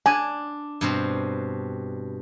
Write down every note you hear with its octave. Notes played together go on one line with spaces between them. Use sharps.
D4 G#5
G2 B2 C4